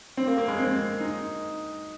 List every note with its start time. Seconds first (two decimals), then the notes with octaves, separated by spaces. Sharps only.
0.17 C4
0.27 A#3
0.38 A#3
0.48 G#3
0.59 C4
1.00 D#4